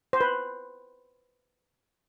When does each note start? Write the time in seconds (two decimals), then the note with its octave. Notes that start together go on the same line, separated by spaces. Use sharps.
0.13 C5
0.21 B4